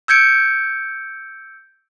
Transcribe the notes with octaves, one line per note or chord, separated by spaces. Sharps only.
E6 G6 G#6 C#7 D7